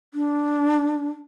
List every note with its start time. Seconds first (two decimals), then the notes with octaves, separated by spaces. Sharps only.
0.14 D4